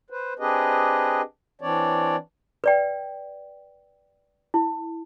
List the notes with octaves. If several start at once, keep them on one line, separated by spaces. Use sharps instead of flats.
B4 C5
C4 D4 G4 G#4 B4 D#5
E3 C4 D4 C#5 D5
B4 D5 G5
E4